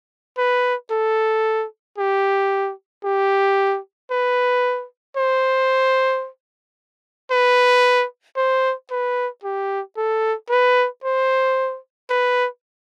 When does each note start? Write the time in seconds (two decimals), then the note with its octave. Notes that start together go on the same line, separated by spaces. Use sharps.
0.38 B4
0.91 A4
1.98 G4
3.04 G4
4.11 B4
5.17 C5
7.31 B4
8.37 C5
8.91 B4
9.44 G4
9.97 A4
10.50 B4
11.04 C5
12.10 B4